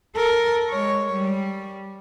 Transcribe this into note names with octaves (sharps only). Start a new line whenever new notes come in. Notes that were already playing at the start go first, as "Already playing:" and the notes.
A4 A#4
G#3 C#5
G3